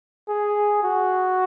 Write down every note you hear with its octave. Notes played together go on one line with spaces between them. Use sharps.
G#4
F#4